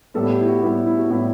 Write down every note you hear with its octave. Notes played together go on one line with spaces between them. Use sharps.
A2 G3 B3 A4
G4
E4
F#4
A2 G3 B3 E4
E4
F#4
A2 G3 B3 E4